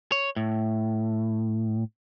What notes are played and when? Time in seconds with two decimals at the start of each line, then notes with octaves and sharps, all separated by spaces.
0.12 C#5
0.36 A2